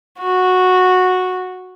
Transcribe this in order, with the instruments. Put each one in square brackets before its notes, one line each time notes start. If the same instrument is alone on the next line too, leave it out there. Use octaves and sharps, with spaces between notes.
[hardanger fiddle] F#4